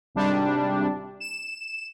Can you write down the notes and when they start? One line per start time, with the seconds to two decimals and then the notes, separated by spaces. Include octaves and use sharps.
0.15 G#1 C3 G3 D4
1.20 E7